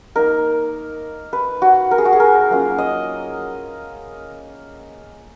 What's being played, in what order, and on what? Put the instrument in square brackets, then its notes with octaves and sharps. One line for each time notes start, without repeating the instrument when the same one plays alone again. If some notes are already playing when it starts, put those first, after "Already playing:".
[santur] A#3 D#4 A#4
B4
F#4
A#4
G#4
F#4
G#4
A#4
F#3 A#3 C#4 F4
D#5